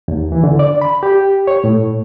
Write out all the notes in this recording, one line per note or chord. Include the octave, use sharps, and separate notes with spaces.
D#2
E3
D3
D5
B5
G4
C#5
A2